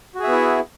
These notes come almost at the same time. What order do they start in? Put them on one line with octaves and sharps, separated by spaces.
F#4 G#4 E5 B3 E4